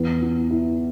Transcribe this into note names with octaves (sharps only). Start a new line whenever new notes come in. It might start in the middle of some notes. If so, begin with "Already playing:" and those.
Already playing: E2 B3
E3
E4